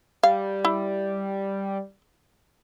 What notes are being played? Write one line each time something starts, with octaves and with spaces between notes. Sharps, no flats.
G3 F5
E4